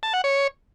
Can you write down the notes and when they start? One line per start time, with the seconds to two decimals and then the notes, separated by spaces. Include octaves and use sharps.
0.03 A5
0.13 F#5
0.24 C#5